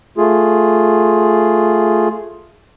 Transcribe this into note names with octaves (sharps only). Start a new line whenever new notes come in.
A3 F4 G#4